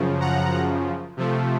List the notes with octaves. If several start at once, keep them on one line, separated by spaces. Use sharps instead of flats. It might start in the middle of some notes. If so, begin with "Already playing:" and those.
Already playing: F#2 C#3 F3
F#5 A#5
C3 F3 A3